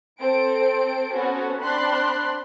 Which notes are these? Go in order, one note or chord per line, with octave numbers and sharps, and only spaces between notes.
C4 A4 C5 D7
B3 C#4 F#4 A4 C5
C4 D4 B5 C6 F#6